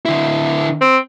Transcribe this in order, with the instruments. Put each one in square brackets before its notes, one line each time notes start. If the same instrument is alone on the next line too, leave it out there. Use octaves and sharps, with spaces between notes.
[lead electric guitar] D3 E4
[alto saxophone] C4